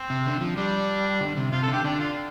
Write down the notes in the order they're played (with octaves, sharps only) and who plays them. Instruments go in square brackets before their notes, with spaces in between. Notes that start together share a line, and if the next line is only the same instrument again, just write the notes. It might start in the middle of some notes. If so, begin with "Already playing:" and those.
Already playing: [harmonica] C4
[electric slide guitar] C3
D3
F3
[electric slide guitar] G3 [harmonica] D4
[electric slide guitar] D3
C3
[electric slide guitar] C3 [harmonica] F4
[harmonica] A4
[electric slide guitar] D3 [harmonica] G4
[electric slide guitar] D3 [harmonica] D4
[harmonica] F4